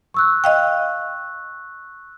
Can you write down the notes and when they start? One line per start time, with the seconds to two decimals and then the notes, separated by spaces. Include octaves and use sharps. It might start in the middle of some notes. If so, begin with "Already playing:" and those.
0.14 C#6 E6 F#6
0.44 D#5 F5 G5